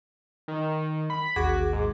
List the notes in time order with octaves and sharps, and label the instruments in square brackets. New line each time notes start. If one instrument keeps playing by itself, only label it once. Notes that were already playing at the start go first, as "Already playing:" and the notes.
[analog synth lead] D#3
B5
[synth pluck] A1 D#2 D6 [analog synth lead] F#4 [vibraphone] G#4
[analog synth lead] G#2